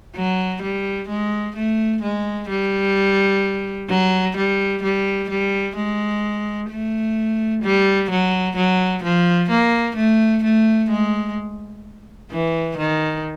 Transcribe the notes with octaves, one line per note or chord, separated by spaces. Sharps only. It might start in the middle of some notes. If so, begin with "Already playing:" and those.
F#3
G3
G#3
A3
G#3
G3
F#3
G3
G3
G3
G#3
A3
G3
F#3
F#3
F3
A#3
A3
A3
G#3
E3
D#3